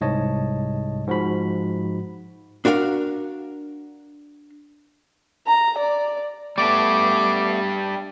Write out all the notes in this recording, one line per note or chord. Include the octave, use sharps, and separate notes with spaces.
C2 G#2 C#5 D#5 A5
G#2 F3 F#4 B5
D4 F#4 A#4 F5
A#5
D5
G3 A3 B3 D4 D6